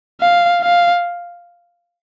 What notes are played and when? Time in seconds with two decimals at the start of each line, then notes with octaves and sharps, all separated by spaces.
0.21 F5
0.62 F5